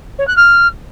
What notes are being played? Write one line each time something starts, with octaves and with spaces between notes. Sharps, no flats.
C#5
F#6
F6